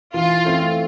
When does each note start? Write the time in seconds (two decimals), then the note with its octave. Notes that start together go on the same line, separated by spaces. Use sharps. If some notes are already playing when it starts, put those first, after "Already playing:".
0.14 E3 F4
0.45 A3 C4